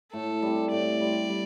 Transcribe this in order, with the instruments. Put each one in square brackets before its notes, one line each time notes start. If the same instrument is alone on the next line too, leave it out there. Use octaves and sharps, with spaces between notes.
[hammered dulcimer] A2 [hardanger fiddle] A4
[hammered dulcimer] G3 C4
[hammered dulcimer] A2 [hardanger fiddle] D5
[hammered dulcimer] G3 C4
G3